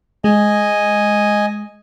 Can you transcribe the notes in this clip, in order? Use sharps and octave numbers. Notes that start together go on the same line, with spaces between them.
G#3 D#5 G#5